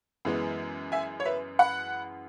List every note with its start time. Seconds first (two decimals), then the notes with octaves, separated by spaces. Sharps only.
0.25 F#2 E3 G#3 B3
0.92 E5 G#5
1.20 C#5
1.25 B4 E5
1.59 F#5 B5